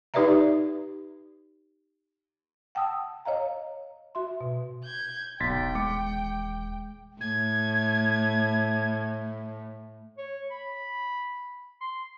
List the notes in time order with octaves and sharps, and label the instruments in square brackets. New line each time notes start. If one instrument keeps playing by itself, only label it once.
[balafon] D#4 G4 B4 D5 E5 A#5
[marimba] F#5 G5 A5 D#6 E6
C#5 D#5 F5 A#5
F#4 E5 C6
B2
[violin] G6 G#6
[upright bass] D#1 E3 [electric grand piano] B1 [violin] G5 [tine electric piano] C6 A6 B6
[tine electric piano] G#3 [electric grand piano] D6 C#7
[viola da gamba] A2 [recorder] G#6
[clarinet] C#5
B5
C6